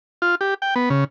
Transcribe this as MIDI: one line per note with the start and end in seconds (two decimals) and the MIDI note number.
0.22 0.35 65
0.41 0.54 67
0.62 0.74 79
0.76 0.89 59
0.90 1.04 49